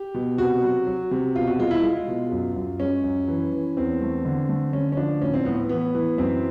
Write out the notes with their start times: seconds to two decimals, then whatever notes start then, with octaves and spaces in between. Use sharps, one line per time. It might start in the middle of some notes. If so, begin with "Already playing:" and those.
Already playing: G4
0.14 B2
0.38 C3 F#4
0.62 F#3
0.87 F#3
1.11 C3
1.35 B2 F4
1.48 F#4
1.59 G#3 F4
1.71 E4
1.83 G#3 F4
2.08 B2
2.32 F#2
2.56 F#2
2.80 G#3 C#4
3.04 F#2
3.28 E3
3.52 E3
3.77 E2 C4
4.01 A3
4.25 D3
4.49 A3
4.73 D3 C#4
4.92 C#4
4.97 F3 D4
5.22 A2 C#4
5.34 C4
5.45 A2 B3
5.69 E3 B3
5.95 E3
6.18 F#2 C4